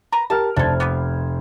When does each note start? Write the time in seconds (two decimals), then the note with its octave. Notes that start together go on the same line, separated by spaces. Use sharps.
0.12 A#4 B4 A#5
0.30 G4 A#4 A5 F6
0.56 F1 D4 A4 C5 G#6
0.80 B3 G4 B4